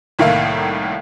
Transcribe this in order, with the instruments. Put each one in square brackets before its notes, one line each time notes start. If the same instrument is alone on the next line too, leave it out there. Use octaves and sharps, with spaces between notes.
[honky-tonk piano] C2 A2 D#3 A#3 E4 F5